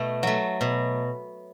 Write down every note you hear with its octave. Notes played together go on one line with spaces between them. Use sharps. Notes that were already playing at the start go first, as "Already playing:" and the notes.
Already playing: B2 A3
F#3 A3
B2